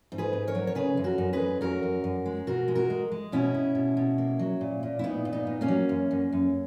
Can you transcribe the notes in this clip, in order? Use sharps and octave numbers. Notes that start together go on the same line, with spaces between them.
G#2
G#4 B4
G#2
A#4 C#5
F#3
C#5
C#3 G#4 B4
F#2
F#4 A#4
F#2
G#4 B4
F#2
F#2 F#4 A#4
F#2
F#2
G#3
B2 F#4 A#4
G#3
F#4 A#4
G#3
G#3
B2 C#4 E4
B2
B2
B2
A#3
F#3
A#2
A#2
E4
A#2 B3 D#4
A#2
B3 D#4
A#2
A#3 C#4
F#3
F#2
F#2
F#2